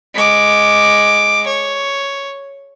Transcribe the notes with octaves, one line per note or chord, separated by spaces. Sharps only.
G#3 D6
C#5